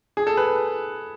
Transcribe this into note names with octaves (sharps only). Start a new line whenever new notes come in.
G#4
A4
B4